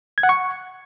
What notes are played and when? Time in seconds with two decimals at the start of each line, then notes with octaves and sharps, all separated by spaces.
0.18 G#6
0.23 F#5
0.29 C#6